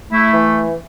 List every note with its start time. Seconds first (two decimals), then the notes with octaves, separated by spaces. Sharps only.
0.12 A3 E4
0.33 E3